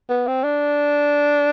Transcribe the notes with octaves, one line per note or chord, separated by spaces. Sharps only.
B3
C4
D4